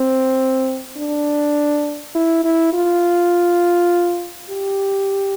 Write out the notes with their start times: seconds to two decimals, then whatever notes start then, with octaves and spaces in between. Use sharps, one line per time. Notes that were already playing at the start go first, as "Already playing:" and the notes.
Already playing: C4
0.97 D4
2.15 E4
2.44 E4
2.74 F4
4.50 G4